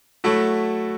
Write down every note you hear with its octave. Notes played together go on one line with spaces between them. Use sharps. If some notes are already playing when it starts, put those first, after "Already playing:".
F#3 A3 E4 F#4 A4